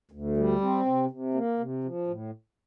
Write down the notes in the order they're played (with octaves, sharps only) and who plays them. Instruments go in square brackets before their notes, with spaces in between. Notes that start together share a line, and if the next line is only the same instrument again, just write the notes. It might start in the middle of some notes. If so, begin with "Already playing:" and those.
[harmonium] D2
G3
C4
C3
C3
A#3
C3
F3
A2